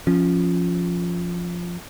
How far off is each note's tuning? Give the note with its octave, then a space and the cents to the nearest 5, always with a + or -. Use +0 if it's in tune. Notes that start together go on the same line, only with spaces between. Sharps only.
F3 +0 C#4 -5